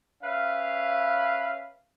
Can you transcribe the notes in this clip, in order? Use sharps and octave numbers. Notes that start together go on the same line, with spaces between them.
C#4 B4 E5 F5